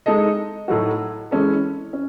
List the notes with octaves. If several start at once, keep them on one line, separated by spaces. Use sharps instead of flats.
G#3 D#4 A4 D#5
A2 F#3 A3 D#4 F#4
E3 G#3 C#4 E4 A4
C#4